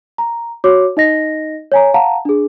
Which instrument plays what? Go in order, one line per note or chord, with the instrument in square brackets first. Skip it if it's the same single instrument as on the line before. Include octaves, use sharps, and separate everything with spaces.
[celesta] A#5
F#4 C#5 D6
D#4 D#5 A#6
C#5 G#5 A#5
F5 F#5 A5 A#5
D4 G#4